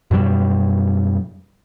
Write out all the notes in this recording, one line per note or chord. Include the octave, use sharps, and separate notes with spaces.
F#2 B2 F#3 G3